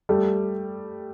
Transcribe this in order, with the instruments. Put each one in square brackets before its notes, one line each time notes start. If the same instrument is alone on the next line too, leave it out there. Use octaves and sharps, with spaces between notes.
[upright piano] G3 A3